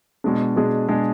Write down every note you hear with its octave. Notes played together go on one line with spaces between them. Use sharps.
B2 G#3 D4 G#4
B2 G#3 D4 G#4
B2 G#3 D4 G#4